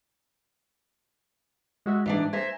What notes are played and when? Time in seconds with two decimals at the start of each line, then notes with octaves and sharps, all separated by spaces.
1.86 G#3 F#4 E5
2.06 G#2 D#3 E3 D4
2.33 C5 E5 G#5 A#5